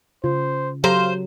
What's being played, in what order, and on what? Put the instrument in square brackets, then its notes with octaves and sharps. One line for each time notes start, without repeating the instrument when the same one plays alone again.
[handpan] C#3 [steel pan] F4 [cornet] C5
[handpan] F#3 [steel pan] G4 A4 A#5 [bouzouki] C5 [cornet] F5